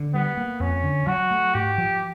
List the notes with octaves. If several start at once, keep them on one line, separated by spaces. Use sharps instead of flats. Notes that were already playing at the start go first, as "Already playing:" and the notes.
Already playing: D3
G3 B3
A#3
F2 C#4
D3
F#3 F#4
A3
G#2 G4
F3